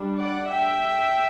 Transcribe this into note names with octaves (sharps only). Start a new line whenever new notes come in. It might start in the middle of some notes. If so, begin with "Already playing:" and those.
Already playing: G3 D4
D5 F#5
E5 G5